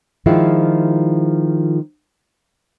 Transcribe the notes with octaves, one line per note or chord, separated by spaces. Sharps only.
D#3 F3 G#3 E4 F4